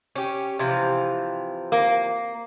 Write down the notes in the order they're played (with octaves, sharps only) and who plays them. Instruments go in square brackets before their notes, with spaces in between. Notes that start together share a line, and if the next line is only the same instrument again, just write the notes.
[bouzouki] C#4 G4
C3 E3 F3
[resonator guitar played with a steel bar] A#3